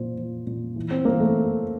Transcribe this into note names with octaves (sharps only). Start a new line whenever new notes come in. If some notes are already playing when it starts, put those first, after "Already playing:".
Already playing: A#2 F3 C5
F3
A#2
E3
C4
E3 A#3
A3